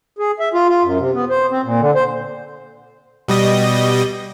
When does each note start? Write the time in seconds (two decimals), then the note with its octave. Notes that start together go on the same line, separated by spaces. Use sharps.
0.19 G#4
0.40 E5
0.54 F4
0.69 F4
0.83 F#2
0.99 C3
1.14 B3
1.30 C5
1.51 C4
1.64 A#2
1.81 D3
1.95 C5
3.28 B2 G3 D#5